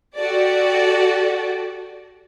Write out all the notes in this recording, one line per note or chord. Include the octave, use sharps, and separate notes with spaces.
F#4 G4 A4 D5